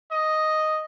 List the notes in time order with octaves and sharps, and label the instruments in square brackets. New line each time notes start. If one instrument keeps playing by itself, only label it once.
[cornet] D#5